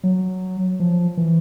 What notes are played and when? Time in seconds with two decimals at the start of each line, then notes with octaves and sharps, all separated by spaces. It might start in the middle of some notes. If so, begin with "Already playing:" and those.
0.04 F#3
0.80 F3
1.17 E3